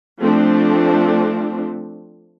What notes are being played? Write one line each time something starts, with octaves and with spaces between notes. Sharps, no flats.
F3 A3 C4 D4